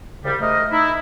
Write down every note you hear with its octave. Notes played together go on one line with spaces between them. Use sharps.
C2 C#3 G3
G#2 A3 A#4 D#5
D#4 E4